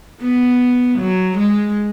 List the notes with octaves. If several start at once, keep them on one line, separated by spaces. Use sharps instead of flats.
B3
F#3
G#3